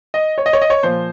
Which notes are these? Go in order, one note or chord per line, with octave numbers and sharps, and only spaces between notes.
D#5
C#5
D#5
C#5
D#5
C#5
A#2 F3 C5